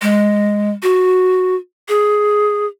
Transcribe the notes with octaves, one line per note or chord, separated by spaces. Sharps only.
G#3
F#4
G#4